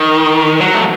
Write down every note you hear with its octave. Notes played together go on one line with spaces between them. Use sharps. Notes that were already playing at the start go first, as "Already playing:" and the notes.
Already playing: D#3
F#3
A3